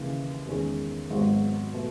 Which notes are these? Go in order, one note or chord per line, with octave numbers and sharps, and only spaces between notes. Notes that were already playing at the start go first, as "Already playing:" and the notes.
Already playing: D#2 C#3 E3
E2 D#3 G#3 C#4
G#1 G#2 F#3 B3 F#4
B2 A3